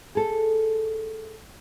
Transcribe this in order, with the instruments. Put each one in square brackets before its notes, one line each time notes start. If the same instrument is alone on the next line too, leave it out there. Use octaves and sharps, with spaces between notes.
[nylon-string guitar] G#4 A4